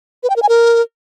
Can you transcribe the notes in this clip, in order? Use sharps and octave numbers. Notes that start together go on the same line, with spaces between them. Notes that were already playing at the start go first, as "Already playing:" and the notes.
B4
G5
A#4
G#5
A#4